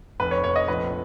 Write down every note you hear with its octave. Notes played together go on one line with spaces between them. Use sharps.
F1 B4
C#5
F1 C#5
D#5
A#1 B4